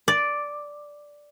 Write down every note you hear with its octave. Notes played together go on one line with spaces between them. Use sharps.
D5